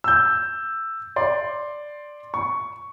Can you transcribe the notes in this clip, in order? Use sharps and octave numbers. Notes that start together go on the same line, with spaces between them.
E6 G6
D5 C6
C#6